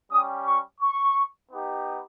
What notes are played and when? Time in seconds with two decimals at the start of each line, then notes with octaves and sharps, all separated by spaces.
0.11 G3 C#4 G4 D#6
0.46 C#6
0.81 C#6
1.52 B3 D#4 G4